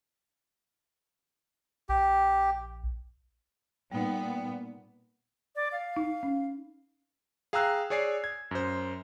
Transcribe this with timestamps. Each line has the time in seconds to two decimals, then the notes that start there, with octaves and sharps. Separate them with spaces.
1.89 A#1 G4
3.91 A#2 G3 B3 D#4
5.56 D5
5.72 F5
5.97 D#4
6.23 C#4
7.53 G#4 F5 G5 A#5 E6 F#6
7.90 G#4 C#5 D5 G#5 C7
8.24 G#6
8.51 F#2 C5